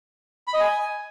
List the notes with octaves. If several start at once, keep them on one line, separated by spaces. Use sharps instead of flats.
B5
D#5
G#5